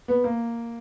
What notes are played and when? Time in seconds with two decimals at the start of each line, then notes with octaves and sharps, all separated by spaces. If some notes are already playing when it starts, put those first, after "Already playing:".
0.08 B3
0.24 A#3